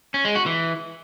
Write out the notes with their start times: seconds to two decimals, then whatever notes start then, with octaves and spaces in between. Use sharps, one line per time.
0.14 C#4
0.25 G#3
0.35 F#4
0.46 E3